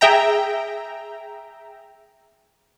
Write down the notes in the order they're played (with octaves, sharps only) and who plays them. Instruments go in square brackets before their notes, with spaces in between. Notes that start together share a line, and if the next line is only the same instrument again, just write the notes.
[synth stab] G#4 E5 G5 A#5